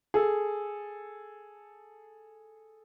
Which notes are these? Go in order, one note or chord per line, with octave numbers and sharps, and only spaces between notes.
G#4 A4